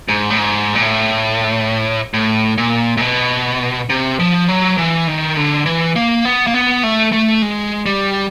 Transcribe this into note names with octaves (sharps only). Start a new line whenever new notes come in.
G#2
A2
G#2
A#2
A2
A2
A#2
A#2
B2
C3
F3
F#3
E3
D#3
D3
E3
A#3
B3
A#3
B3
A3
A3
G#3
G3